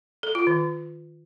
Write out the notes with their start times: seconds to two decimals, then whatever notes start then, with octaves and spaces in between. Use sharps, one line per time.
0.23 A4
0.35 F4
0.47 D#3